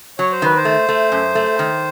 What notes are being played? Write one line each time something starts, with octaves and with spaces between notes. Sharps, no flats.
F#3 C#5
C5
D#3 B4
C5
A3
A3
F#2
A3
D#3